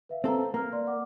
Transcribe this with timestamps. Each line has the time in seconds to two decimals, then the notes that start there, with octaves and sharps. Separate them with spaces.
0.09 B4 E5 F5
0.24 C4 A4 B4 F5 A#5
0.54 A#3 A#5 F6
0.73 D5 C6
0.87 F#5 D6